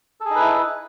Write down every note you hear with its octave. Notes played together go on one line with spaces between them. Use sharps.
D#4 E4 G#4 A4 B4